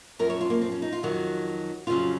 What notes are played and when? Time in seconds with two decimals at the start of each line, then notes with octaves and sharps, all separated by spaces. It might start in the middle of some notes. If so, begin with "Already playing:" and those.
0.19 F#2 F3 A#4
0.30 C#5
0.41 F4
0.50 A#3
0.61 C4
0.72 C#4
0.82 D#4
0.93 F4
1.03 F2 D#3 F#3 F#4
1.87 F2 C#3 F#3 F4